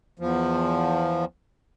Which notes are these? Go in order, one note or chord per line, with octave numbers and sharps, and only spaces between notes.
E2 F3